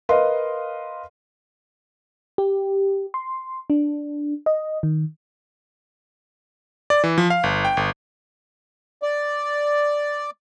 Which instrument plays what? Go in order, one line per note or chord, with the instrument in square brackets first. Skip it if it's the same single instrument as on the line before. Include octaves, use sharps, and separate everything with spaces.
[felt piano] A#4 B4 D#5 F5 C6
[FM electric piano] G4
C6
D4
D#5
D#3
[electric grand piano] D5
E3
F3
F5
G1
G5
G1
[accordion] D5